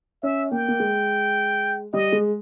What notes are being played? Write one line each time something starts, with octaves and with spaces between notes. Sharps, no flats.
C#4 E5
A#3 G5
A#3
G#3
G3 D#5
G#3